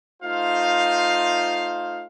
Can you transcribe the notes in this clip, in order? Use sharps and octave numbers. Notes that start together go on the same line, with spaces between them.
A3 D#4 F4 C5 F5